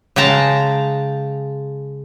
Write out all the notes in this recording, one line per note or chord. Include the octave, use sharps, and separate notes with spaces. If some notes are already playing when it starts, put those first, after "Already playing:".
C#3 G#3 G5 A5 A#5